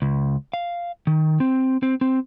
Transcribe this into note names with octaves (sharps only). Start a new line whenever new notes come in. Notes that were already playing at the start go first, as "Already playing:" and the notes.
C#2
F5
D#3
C4
C4
C4